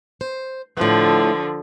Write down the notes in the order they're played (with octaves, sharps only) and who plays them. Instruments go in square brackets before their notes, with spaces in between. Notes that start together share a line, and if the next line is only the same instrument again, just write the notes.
[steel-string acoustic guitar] C5
[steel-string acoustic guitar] A2 B3 [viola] D3 F3